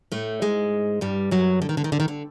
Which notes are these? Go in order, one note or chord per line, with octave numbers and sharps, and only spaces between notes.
A2 A3
G#2 G#3
G2 G3
F#2 F#3
D3
D#3
D3
D#3
D3
D#3
D3